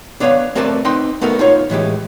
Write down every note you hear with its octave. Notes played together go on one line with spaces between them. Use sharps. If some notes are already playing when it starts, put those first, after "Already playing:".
B3 D4 B4 C#5 D#5 F5
A3 C4 A#4 B4 D5 A5
C4 D#4 B4 D#5 G5 C6
A3 B3 D#4 F#4 A4 A#4
D#4 F4 C#5
A2 E3 G#3 G4